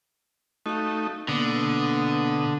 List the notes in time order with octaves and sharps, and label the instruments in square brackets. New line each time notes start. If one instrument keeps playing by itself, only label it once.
[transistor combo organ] A3 D#4 [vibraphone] F#4 F5
[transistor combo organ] B2 D#6 [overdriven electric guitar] D3 [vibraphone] A#3 B4